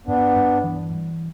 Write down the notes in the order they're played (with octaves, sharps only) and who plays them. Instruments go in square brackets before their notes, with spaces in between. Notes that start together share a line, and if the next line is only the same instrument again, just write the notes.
[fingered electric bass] G2 [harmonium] B3 D4
[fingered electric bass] G2
E3
G3